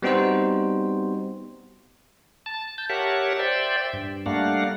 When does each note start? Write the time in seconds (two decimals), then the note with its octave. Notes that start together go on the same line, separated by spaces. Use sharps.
0.02 G3 B3 C4 D#4 F#4 C5
2.46 A5
2.78 A5 G6
2.90 G4 A#4 C#5 E5 F#5 A5
3.39 C5 D5 E5 G5
3.93 G2
4.26 G3 A3 A#3 D4 F5 F#5